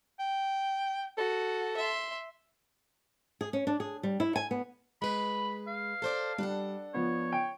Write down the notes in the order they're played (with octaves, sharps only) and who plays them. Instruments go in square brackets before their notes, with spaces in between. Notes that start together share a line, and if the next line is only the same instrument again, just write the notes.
[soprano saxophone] G5
[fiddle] F#4 [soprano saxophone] A4
[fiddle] E5 C6
[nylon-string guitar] G#4
C#4
D4
G#4
G3
E4
G#5
B3
[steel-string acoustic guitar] G#3 B4 [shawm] B5
[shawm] F5
[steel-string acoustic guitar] A4 C5 D5
[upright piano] G3 [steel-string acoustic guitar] D4 A4 F#5
[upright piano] F3 B3 [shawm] C#5
[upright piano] G5 D7